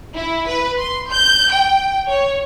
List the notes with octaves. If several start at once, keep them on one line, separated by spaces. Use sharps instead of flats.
E4
B4
C6
G6
G5
C#5